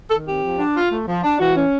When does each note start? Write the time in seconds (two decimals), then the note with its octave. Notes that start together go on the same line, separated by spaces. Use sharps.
0.09 D#3 A4
0.25 C4 G4
0.42 F3
0.58 D4
0.74 F4
0.90 A3
1.07 F3
1.23 D4
1.40 E3 F#4
1.56 C#4